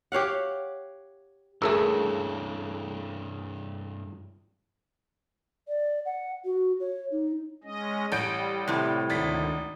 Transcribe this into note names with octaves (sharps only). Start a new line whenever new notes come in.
G4 C#5 F5 F#5
D2 G2 C#3 E3 A3 G#4 A#4 E6
D5
F#5
F#4
C#5
D#4
G#3 C#4 D#5
A1 G3 G6 D7
A2 C3
G#1 D2 D#3 A6 B6